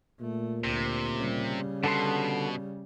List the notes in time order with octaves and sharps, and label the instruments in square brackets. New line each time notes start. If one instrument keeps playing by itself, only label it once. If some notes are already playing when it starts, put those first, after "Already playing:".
[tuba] A#2 [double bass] A3
[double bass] D2 [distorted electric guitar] C3
[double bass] C#3 G3
[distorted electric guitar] B2 [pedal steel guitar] D3 A4 C6